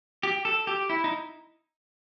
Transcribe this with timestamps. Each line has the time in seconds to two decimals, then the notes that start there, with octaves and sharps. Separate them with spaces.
0.23 G4
0.45 A4
0.67 G4
0.90 E4
1.04 D#4